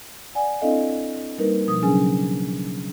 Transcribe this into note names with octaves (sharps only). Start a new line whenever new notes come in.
D5 F#5 G#5
C4 D4 E4 A4 D#5 F5
G3 A#3 D#4 A#4 B4
B2 F3 D#6
C#3 F#3 C#4 D4 G#4 G#5